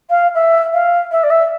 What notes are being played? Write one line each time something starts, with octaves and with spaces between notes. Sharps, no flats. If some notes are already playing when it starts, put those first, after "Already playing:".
F5
E5
F5
E5
D5
E5